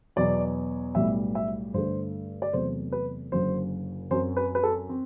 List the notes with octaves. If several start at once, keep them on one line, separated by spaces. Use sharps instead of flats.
E2 B2 F#3 B3 D5
B1 A2 G3 B3 E5
E5
G2 D3 A3 C5
D5
E2 C3 F#3 A3 C5
B4
F#1 F#2 D3 F#3 C5
F#2 F#3 C4 C5
B4
B4
A4
C4